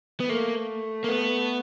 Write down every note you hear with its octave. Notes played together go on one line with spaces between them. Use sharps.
B3
A3 A#3
A#3
B3